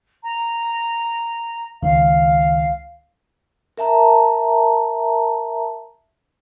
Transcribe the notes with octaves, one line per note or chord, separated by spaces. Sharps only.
A#5
C#2 D#3 F5
A#4 E5 A5 A#5